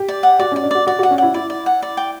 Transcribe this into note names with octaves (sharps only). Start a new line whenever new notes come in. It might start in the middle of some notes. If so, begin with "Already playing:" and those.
Already playing: G4
D5
F#5
F#4 D5
C#4 D5
D4
F#4 D5
F#4 D5
F#4 F#5
C#4
E4 F#5
E4 D5
D5
F#5
D5
G5